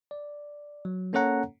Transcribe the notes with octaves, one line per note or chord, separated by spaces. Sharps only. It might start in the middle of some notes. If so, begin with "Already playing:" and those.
D5
F#3
A#3 C#4 A4 C#5 F#5 A#5